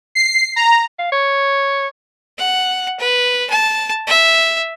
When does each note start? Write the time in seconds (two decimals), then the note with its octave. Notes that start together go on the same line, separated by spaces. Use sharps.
0.15 C7
0.56 A#5
0.99 F5
1.12 C#5
2.38 F#5
3.00 B4
3.50 A5
4.07 E5